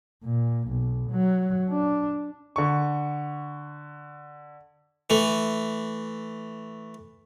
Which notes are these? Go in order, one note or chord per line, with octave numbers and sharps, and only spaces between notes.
A#2
B1
F#3
D4
D3 C#6
E3 A3